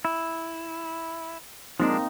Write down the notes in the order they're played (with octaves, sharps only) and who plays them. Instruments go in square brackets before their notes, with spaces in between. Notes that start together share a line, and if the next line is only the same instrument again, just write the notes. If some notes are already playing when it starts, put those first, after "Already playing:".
[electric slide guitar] E4
[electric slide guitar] F3 G#3 D4 [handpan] A#3 C4 D#4